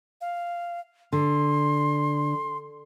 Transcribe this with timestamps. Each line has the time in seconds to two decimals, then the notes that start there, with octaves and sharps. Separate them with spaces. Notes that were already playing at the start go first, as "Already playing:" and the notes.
0.21 F5
1.13 D3 C6